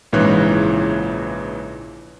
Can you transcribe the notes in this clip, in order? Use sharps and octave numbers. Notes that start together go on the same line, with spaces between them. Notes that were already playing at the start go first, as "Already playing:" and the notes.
A#1 G#2 C#3 E3 C#5 F#6